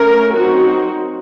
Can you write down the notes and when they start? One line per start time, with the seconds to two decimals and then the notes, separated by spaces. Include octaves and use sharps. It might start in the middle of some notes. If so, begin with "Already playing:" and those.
Already playing: A3 C#4 A#4
0.35 F#3 C4 D#4 F#4